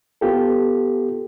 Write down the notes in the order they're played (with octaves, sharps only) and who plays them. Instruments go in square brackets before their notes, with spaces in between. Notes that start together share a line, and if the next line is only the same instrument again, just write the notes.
[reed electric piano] B3 F4 G4 A4